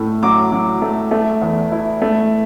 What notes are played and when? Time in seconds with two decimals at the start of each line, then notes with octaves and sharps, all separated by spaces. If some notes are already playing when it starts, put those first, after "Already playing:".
Already playing: A2 A3
0.23 F#3 D6
0.52 F#3
0.82 A3
1.11 A3
1.41 E2
1.72 E4
2.02 A3